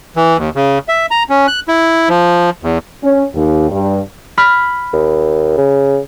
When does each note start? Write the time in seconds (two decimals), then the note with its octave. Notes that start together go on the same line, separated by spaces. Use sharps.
0.16 E3
0.38 D#2
0.55 C#3
0.88 E5
1.11 A#5
1.30 C#4
1.48 F#6
1.68 E4
2.09 F3
2.63 E2
3.03 C#4
3.34 D#2
3.70 G2
4.38 B5 F6 B6
4.93 D#2
5.57 C#3